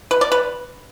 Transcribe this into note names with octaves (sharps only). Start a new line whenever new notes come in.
B4
D5
B4